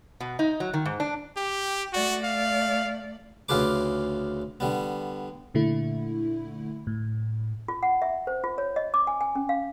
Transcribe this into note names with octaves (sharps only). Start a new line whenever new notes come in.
B2
D#4
F#3
D#3
G#2
D4
G4
A3 F#4 D5
F5
D2 C#3 F4 G#4 B4 D6
D3 G3 B3
A#2 D3 A3 E4
A2
F4
F#5
E5
C5
F4
C#5
D#5
D6
G#5
G#5
C#4
F5